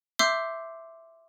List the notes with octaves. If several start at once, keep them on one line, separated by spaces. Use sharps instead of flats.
E5 C6 D6 E6 G6 C7